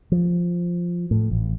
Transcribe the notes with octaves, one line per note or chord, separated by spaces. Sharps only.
F3
A2
A1